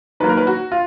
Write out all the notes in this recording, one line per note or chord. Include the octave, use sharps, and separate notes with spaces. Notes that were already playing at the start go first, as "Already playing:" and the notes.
D#3 F#3 A#3 B4
A#4
B4
F#4
F4